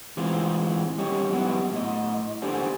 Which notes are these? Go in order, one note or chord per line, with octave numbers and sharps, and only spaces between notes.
E3 G#3 C4 F4 G#4
G3 C#4 G4 C#5 D#5
F#3 B3 E4 F#4 G4
A2 D#5
D4 G4 A4 C5 D5 G#5